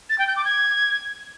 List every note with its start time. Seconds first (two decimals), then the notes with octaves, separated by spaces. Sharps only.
0.10 A6
0.18 G5
0.27 G6
0.36 D6
0.45 G#6